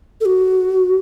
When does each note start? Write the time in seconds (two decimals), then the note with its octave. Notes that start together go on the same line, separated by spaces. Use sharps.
0.21 A4
0.25 F#4